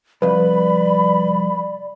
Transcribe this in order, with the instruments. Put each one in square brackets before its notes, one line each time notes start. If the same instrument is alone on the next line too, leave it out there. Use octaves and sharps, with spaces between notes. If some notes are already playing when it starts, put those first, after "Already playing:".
[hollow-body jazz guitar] C2 F2 [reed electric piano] B4 [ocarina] D5 [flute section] B5